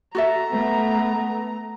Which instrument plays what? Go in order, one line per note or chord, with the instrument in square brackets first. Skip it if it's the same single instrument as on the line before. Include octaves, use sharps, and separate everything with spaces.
[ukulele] F#4 A4 E5 [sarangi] A#5
[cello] A3 [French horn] B3